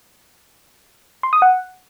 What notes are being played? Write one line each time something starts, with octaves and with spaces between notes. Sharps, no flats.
C6
D#6
F#5